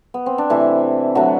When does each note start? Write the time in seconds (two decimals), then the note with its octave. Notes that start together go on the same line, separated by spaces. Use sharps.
0.14 B3
0.26 C4
0.38 D4
0.50 C3 E3 A3 E4
1.15 D3 F#3 A3 F#4